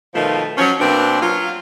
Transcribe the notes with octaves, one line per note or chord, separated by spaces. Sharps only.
B2 D#3 F3 A3 F4
F3 F#3 C#4
B2 A#3 C4 D4
F#3 F4